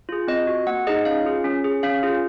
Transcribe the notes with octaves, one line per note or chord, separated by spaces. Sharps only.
F4 G#4
C4 D#5
F#4
A#3 F#5
D#4 G#4 D#5
C#4 F5
F4 G#4
C#4
G#4
C#4 F5
F4 G#4